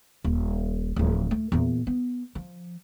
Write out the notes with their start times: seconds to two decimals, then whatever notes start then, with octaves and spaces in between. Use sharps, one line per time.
0.24 D#1
0.96 D1 F3
1.31 A3
1.52 E2 A#2
1.87 B3
2.35 F3